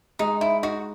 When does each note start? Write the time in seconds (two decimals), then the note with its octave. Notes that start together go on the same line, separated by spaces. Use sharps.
0.19 G#3 D#4
0.41 D#4 E4
0.63 D#4 F#4